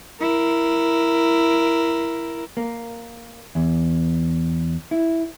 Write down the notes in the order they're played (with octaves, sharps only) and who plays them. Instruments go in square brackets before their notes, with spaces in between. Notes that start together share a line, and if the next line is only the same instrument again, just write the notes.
[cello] E4 A#4
[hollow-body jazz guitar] A#3
E2
E4